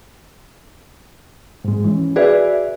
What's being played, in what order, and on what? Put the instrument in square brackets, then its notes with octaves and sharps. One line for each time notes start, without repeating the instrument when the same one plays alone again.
[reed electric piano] G#2 G#3
E3 C#4
[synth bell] F#4 G#4 B4 [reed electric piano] D5 E5